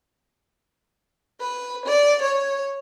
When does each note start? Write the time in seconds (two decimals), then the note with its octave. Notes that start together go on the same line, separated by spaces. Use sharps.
1.39 B4
1.84 D5
2.22 C#5